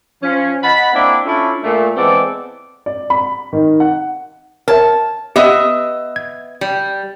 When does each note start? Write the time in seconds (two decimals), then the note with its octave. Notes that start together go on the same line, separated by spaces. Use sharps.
0.22 F3 C#4
0.62 D#5 F#5 A5 B5
0.92 A#3 C4 D4 E4
1.25 C#4 D4 E4 F4 A4
1.62 A#2 A3
1.96 E3 G#3 B3 C4 A4 D5
2.86 D5
3.10 B5
3.53 D#3
3.80 F#5
4.68 A#4 C#5 E5 A5
5.36 B3 G4 D#5 E5
6.16 G#6
6.61 G3